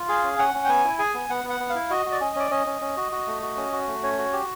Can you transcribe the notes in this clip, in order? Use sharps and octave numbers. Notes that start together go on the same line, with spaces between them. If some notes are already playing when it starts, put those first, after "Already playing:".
Already playing: F4
G#4 F5
C#4
C#4 F#5
C#4
G5
B3 G#5
E4
G#4 G#5
B3
B3 F#5
B3
F#5
B3
F5
E4
F#4 D#5
F#4
D5
C#4 D#5
C#4 D5
C#4 D#5
C#4
C#4
F#4
F#4
A3
F#4
C#4
F#4
A3
C#4 C#5
F#4
G4